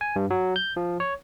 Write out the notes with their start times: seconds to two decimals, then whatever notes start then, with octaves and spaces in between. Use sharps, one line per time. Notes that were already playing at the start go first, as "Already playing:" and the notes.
0.01 G#5
0.16 G2
0.30 F#3
0.56 G6
0.76 F3
1.00 C#5